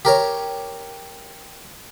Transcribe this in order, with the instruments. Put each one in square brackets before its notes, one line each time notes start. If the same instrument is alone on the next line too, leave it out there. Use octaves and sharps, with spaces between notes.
[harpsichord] G4 A#4 C#5